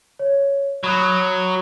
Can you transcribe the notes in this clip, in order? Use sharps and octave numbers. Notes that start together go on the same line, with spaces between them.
C#5
F#3 B5 D#6 F#6